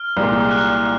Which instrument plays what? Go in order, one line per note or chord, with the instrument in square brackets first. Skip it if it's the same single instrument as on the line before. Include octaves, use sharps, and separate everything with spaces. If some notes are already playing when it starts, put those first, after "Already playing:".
Already playing: [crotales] F6
[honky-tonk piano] C2 A#2 G#3
[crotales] F#6